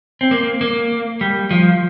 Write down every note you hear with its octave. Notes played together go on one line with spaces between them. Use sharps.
C4
A#3
A#3
G3
F3